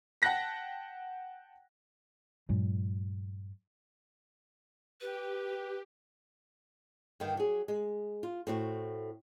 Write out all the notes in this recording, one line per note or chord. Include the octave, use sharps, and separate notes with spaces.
F#5 G5 A5 F#6 A#6 B6
G2 A#2 F#3 G#3
G4 B4
G2 D3 D#3
F#3 G#4
G#3
F4
A2 C4 F#4